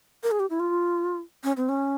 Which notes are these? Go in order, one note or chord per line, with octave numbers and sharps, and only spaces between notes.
A#4
G#4
G4
E4
F4
C#4
C4
C#4